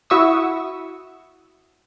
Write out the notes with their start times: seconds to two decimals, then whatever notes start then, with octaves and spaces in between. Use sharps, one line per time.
0.10 E4 F#4 E5 C#6 D#6 E6